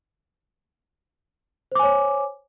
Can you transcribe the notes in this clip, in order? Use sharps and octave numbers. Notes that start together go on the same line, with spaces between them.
C5 C#5 G#5 D6